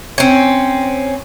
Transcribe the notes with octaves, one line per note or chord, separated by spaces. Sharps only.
C4 C#4